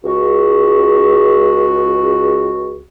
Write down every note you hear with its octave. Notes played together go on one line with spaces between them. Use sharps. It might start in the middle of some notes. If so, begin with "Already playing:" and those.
C#2 F#4